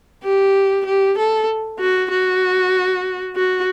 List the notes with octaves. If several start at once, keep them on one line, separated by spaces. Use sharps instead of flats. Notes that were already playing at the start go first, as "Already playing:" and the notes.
G4
G4
A4
F#4
F#4
F#4